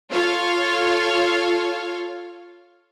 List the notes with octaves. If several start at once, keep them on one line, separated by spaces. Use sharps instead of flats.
F4 A4 C#5 F5